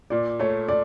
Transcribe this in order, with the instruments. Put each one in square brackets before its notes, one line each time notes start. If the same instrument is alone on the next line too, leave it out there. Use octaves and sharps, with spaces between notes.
[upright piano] A#2 [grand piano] D5
[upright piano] A3 [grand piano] C#5
[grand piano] D5